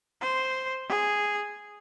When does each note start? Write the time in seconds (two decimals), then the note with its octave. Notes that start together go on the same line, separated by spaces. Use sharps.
0.21 C5
0.89 G#4